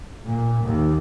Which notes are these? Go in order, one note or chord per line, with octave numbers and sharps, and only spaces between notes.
A#2
D#2